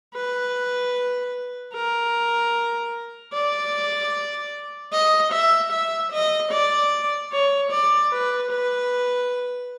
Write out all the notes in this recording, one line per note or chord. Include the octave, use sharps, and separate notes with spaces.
B4
A#4
D5
D#5
E5
E5
D#5
D5
C#5
D5
B4
B4